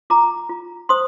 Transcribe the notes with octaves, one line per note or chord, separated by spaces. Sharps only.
F4 A#5 D6
F4
C5 C6 D#6